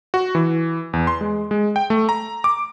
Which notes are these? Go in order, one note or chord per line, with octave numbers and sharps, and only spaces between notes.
F#4
E3
E2
C6
G#3
G#3
G5
A3
A#5
D6